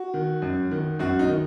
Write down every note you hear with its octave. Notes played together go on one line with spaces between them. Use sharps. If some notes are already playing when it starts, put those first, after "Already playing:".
Already playing: F#4
D#3
F#2
D#3
F#2 F#4
D#4
D#3